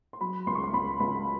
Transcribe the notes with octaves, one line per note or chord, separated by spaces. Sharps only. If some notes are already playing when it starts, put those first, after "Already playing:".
C6
F#3 B5
C#2 C6
C#6
C6
C#2 B5
C#2 B5